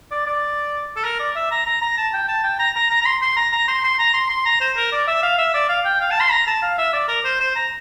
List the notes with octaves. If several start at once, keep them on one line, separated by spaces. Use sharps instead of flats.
D5
D5
A4
A#4
D5
E5
A#5
A#5
A#5
A5
G5
A5
G5
A#5
A#5
A#5
A#5
C6
C6
A#5
A#5
C6
C6
A#5
C6
C6
A#5
C5
A#4
D5
E5
F5
E5
D5
F5
G5
F5
A5
C6
A#5
A5
F5
E5
D5
A#4
C5
C5
A#5